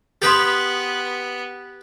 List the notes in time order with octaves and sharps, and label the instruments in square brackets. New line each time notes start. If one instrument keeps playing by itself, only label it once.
[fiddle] B3 [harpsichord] G4 B4 [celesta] C6 D#6 A6